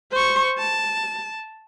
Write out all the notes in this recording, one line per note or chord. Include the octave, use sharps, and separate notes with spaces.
C5 C#6
A5